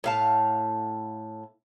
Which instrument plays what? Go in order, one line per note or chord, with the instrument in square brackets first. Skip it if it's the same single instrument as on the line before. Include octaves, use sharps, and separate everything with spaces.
[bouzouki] A2 F5 A5